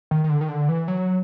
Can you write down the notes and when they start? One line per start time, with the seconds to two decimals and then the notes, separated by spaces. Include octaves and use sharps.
0.11 D#3
0.24 D#3
0.30 D3
0.41 D#3
0.49 D3
0.69 E3
0.88 F#3